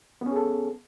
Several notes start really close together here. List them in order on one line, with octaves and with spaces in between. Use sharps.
B3 C#4 G#4 A4